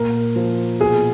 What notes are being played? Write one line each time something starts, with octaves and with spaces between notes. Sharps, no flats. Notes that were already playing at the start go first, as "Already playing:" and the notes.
Already playing: A#2 A#4
F3
B2 G#4